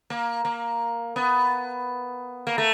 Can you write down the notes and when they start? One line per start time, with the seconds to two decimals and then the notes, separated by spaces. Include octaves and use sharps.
0.10 A#3
0.45 A#3
1.16 B3
2.47 A#3
2.58 A3